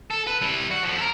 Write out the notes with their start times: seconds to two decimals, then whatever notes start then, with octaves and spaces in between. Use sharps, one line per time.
0.10 A4
0.27 B4
0.42 G3 E4
0.71 F#4
0.83 F2 F3
0.98 A4 A#4